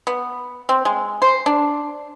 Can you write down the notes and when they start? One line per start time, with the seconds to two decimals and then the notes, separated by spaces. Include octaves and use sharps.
0.07 B3
0.69 C4
0.85 G#3
1.22 C5
1.46 D4